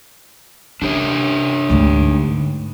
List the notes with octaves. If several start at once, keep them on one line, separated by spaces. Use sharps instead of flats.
C#4 D4 G4 C#5
D2 G#2